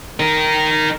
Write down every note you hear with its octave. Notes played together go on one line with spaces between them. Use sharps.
D#4 A#4